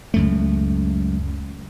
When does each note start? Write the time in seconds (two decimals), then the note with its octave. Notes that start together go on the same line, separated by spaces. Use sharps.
0.14 C#2 F#2 A3